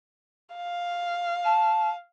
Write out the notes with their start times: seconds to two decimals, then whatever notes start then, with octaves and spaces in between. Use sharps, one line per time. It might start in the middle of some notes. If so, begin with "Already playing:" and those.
0.55 F5
1.44 A5